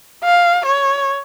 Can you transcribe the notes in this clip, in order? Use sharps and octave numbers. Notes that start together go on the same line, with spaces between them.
F5
C#5